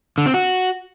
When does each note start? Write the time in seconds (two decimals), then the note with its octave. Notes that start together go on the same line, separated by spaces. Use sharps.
0.18 D3
0.26 C4
0.34 F#4